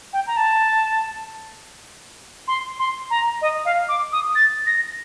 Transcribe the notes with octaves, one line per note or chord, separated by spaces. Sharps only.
G5
A#5
A5
C6
C6
A#5
D#5
F5
D6
D#6
A6
A#6